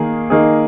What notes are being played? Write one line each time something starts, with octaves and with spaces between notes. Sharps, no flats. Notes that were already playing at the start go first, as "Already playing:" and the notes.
Already playing: D#3 A#3 G#4
D#3 A#3 D#4 G#4